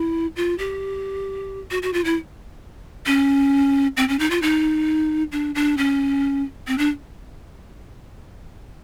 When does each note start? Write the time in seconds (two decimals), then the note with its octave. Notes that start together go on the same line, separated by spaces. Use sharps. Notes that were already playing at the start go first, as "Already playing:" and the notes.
Already playing: E4
0.36 F4
0.58 G4
1.71 F#4
1.83 F#4
1.93 F4
2.05 E4
3.06 C#4
3.97 C4
4.09 C#4
4.19 D#4
4.31 F4
4.42 D#4
5.32 D4
5.55 D4
5.78 C#4
6.67 C4
6.78 D4